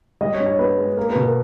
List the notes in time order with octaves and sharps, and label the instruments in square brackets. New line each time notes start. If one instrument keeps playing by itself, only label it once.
[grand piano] G3 [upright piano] D#5
[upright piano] C#5
[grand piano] G2
[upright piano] C#5
[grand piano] B3 [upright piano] B4
[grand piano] G#3
[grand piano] A#3 [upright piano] A#4
[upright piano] B4
[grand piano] B2
[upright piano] A#4